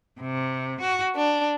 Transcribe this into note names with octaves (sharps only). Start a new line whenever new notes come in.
C3
F#4
D4